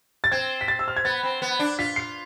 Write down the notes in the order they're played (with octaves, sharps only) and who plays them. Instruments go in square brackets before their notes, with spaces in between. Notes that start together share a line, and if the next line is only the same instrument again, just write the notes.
[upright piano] A6
[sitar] C4 [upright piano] G#6
[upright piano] B6
A6
E6
F6
G#6
[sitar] B3 [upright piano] A6
[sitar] C4
B3
D4
[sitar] F4 [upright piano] B6
[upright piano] C7